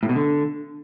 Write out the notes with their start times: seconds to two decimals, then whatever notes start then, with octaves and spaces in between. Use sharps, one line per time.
0.03 A2
0.09 B2
0.16 D3